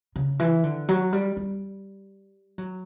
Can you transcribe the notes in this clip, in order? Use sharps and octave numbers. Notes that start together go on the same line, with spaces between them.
C#3
E3
D3
F#3
G3
G3
F#3